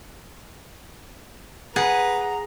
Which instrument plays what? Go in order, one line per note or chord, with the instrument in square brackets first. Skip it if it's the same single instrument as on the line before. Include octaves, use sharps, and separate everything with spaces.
[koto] G#4 [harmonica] B4 [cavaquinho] F#5 [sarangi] A#5